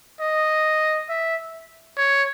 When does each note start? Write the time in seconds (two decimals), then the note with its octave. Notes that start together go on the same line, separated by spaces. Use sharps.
0.20 D#5
1.09 E5
1.98 C#5